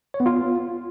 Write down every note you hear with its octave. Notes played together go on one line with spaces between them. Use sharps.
C#5
B3
F4